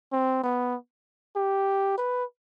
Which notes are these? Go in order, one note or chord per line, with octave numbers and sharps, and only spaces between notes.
C4
B3
G4
B4